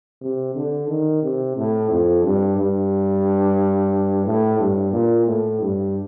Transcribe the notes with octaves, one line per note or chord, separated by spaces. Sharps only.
C3
D3
D#3
C3
A2
F2
G2
G2
A2
G2
A#2
A2
G2